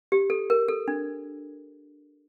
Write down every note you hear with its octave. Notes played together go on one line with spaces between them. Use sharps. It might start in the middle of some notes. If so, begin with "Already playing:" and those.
G4
A4
A#4
A4
D4